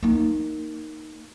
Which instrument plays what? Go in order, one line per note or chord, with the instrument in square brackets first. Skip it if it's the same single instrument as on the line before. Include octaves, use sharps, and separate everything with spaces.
[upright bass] A#3 D#4